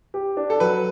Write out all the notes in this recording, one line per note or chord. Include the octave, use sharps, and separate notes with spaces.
G4
D4
A4
F#3 B4